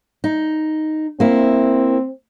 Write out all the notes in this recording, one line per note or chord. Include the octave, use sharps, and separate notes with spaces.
D#4
A#3 C4 E4